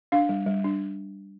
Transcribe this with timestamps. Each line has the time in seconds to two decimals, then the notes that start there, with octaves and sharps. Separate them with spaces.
0.12 D4 F5
0.29 G3
0.46 G3
0.64 D4